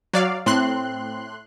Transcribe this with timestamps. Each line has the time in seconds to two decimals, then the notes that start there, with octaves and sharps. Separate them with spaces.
0.13 F#3 D5 F5
0.46 A2 C4 C6 F#6